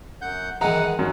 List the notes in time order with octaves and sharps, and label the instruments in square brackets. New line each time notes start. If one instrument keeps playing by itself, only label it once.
[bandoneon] F#2 F#5 G6
[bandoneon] F#2 F#5 [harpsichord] D#3 E3 G#3 [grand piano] A#5
[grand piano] F#2 [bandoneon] D#3